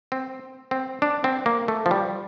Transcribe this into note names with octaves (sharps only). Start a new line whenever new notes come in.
C4
C4
D4
C4
A#3
A3
F3
G3